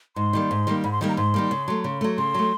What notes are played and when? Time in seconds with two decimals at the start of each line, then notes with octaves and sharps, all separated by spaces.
0.16 G#2 C6
0.33 D#3 G3 A#3
0.51 G#2
0.67 D#3 G3 A#3
0.84 G#2 B5
0.92 C6
1.01 D#3 G3 A#3
1.09 A#5
1.17 G#2 C6
1.34 D#3 G3 A#3
1.51 C#3
1.68 F#3 A3
1.84 C#3
2.01 F#3 A3
2.18 C#3 C6
2.34 F#3 A3